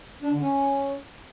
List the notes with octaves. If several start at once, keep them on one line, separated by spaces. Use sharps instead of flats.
D4
D3
C#4